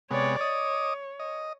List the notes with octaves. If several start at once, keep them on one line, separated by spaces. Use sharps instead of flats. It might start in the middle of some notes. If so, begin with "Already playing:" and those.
C3 G#3 B3 C#5 D5
C#5 D#5 D6 D#6
D#5